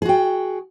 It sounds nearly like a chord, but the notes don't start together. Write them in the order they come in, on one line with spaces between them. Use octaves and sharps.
G#4 F#4 G5